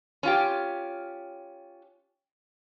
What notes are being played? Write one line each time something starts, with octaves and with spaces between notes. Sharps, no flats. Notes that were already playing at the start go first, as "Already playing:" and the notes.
C#4 F4 G4